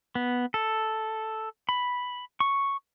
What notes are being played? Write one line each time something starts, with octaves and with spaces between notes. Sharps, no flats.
B3
A4
B5
C#6